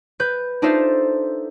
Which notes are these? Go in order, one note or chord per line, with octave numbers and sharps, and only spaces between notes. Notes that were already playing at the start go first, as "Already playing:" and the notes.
B4 G6
D4 D#4 F4 A4 C5 E5